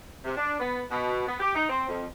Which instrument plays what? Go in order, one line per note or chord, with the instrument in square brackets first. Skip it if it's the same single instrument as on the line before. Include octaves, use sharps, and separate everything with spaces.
[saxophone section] C3
D4
B3
B2
B3
G4
D#4
C4
F2